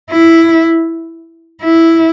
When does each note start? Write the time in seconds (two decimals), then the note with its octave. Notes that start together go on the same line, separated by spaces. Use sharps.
0.11 E4
1.62 E4